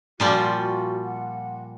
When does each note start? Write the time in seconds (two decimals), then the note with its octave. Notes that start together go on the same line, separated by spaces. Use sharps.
0.20 A#2 F3 G3 F#4
1.04 F#5